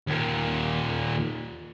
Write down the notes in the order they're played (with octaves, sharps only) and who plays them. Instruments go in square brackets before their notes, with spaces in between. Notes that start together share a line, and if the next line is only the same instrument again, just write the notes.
[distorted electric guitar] D#2 A#2